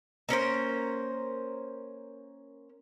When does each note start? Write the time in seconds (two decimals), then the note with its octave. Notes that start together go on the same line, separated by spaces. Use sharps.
0.29 A#3 C#4 A#4 C5